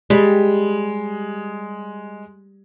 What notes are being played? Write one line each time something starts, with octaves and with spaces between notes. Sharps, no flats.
G3 G#3